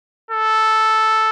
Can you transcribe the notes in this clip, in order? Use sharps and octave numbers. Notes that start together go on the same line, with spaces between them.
A4